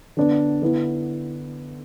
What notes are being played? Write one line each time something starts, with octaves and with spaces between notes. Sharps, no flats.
D3 B3 D4
D3 B3 E4